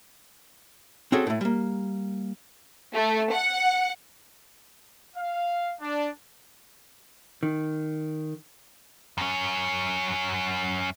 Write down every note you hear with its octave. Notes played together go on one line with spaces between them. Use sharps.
C4 C#4 F#4 G#4 A4
A2 A3
G3 A#3
A3
F#5
F5
D4
D#3
F#2 C#4